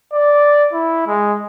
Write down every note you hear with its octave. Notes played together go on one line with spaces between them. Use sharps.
D5
E4
G#3